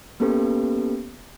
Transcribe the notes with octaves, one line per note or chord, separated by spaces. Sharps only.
A#3 B3 C#4 G4 A4 B4